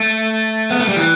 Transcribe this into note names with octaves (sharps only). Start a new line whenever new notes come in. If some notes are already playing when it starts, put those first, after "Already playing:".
Already playing: A3
B3
A3
G3
E3